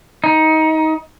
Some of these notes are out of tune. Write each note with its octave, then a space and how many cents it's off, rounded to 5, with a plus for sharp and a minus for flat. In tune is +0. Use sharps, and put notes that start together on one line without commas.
D#4 +20